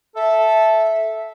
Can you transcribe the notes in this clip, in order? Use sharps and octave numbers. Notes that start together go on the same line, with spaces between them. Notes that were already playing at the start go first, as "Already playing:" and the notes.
A4 E5